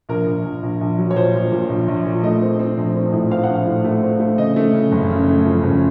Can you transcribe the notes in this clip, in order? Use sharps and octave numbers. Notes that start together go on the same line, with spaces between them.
A#1 A#4
A#1
A#1
A#1
A#1
F#3
C#5
A#2 C5
A#2
A#2
A#1
A#1
A#2
A3 D#5
C4
C4
A#1
C4
A2
C4 F5
F#5
A#1
F5
A2
A3
C4
A3
C#3 D#5
A3
C#3
F#1
C#3
A3
F2
F#1